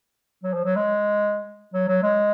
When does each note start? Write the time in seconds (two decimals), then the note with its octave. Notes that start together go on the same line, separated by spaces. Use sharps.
0.43 F#3
0.54 F3
0.65 F#3
0.76 G#3
1.74 F#3
1.88 F#3
2.03 G#3